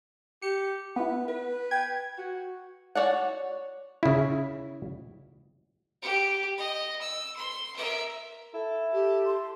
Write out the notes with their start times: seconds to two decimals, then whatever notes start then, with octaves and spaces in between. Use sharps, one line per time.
0.42 G4 C#7
0.96 B3 E4 B4
1.28 B4
1.71 G5 G#6
2.18 F#4
2.95 F#4 C#5 D5 F#5
4.03 C#3 E4
6.02 G4
6.58 D#5
7.01 E6
7.36 C6
7.76 A#4 E5
8.54 E4 A4
8.93 G4
9.26 C6